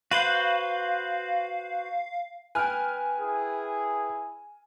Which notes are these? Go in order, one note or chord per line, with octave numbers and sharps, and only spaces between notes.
F#4 B4 C5 F5
B4 G5 G#5 F6
E4 G#4